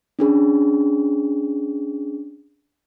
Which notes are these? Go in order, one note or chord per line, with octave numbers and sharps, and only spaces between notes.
C#4 D4 G#4